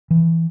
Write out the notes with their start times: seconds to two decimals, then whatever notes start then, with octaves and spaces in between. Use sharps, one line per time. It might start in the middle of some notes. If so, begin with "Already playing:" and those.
0.11 E3